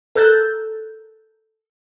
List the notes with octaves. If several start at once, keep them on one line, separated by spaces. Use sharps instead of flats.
A4 A#4 E6 F#6 G6 A6